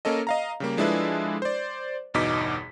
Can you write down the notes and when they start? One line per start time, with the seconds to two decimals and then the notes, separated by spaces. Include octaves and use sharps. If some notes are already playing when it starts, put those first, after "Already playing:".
0.05 A#3 C#4 A4 D#5
0.27 D#5 F5 A#5
0.60 C#3 G3 A#3
0.77 F3 G#3 D4 E4 A4 B4
1.42 C5 D5
2.14 G1 E2 B2 D#4 D6 B6